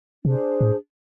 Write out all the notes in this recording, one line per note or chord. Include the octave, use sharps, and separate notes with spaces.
C3 D4 G#4 C5
A2